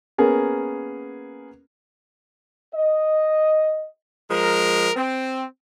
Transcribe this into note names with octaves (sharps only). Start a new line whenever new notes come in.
A#3 B3 C#4 G#4 A#4
D#5
F3 G#3 A#4
C4